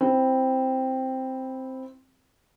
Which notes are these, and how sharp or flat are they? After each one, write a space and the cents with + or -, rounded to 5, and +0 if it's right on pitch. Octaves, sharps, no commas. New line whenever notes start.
C4 +0 E4 +0